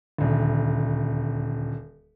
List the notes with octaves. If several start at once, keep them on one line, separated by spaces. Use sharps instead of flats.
D#1 D2